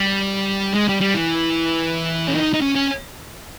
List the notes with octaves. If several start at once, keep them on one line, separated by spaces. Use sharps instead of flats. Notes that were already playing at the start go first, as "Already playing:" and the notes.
Already playing: G3
G#3
G3
G3
E3
C#4
D#4
D#4
C#4
C#4